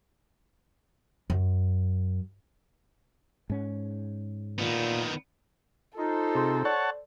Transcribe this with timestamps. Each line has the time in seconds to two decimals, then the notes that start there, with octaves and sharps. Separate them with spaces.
1.30 F#2
3.50 G#2 C#4
4.59 A#2 D#3 B3
5.97 D#4 F4 A4 C5
6.35 C3 G#4 C6
6.65 C#5 D5 F#5 A5